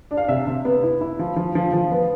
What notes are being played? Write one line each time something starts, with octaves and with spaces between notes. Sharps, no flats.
D4
F5
C3 E5
C3
B3
E4
E4
F3
F3
F3
F3
B3